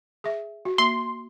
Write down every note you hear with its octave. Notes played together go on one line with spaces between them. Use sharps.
G#4 E5
F#4
A#3 C6